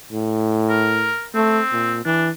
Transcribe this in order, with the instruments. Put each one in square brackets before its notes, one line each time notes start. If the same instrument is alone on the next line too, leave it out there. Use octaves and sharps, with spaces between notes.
[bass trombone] A2
[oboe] A#4
[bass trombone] A3 [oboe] C4
[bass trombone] A#2
[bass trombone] E3 [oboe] D4